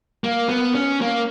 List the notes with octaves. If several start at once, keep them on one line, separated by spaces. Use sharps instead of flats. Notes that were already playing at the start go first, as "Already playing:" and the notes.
A#3
B3
C#4
A#3